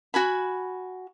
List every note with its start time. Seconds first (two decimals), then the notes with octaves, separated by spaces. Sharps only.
0.14 F#4 G#5 B5